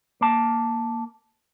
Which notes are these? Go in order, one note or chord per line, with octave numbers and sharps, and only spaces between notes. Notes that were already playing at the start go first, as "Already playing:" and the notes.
A#3 A5